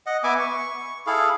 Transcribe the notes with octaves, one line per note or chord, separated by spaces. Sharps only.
D#5 F#5
B3 E5 G#5 D6
C#6
E4 G#4 A4 F5